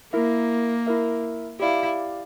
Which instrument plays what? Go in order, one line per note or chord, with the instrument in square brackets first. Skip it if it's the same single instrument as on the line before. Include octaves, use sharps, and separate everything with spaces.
[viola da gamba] A#3 [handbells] E4 A#4 E5
[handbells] E4 A#4 E5
[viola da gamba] E4 [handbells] G4 D5 F5